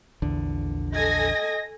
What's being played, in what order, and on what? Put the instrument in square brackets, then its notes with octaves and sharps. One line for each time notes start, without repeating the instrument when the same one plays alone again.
[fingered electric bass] A#1 E2 D3
[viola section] A4 G#5 [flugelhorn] D#5 [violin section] A#6